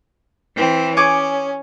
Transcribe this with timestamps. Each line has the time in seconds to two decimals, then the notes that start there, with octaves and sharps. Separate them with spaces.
0.55 E3 C4
0.97 C#4 G#4 C#5 D6